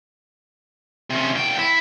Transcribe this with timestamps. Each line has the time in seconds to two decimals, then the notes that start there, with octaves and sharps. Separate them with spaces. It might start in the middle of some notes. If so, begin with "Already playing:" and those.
1.11 C3 C#4
1.35 E2 G5
1.59 E4